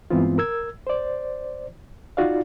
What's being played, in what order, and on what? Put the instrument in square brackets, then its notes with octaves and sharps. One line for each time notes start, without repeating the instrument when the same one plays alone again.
[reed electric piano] G2 E3 G#3 B3 C4 F4
A#4 E6 G#6
C5 D5
D#4 F4 F#4 D5 F5